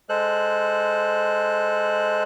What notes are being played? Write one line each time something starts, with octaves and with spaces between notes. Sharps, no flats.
G#3 A4 C5 F#6